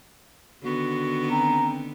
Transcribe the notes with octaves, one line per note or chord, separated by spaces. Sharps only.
D3 D#3 B3 F#4
C4 A#5